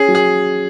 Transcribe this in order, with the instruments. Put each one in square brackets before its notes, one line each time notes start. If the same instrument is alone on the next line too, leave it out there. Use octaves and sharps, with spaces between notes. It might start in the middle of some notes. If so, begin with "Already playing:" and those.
Already playing: [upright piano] C#4 [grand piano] G#4
[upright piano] F#3
[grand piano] G#4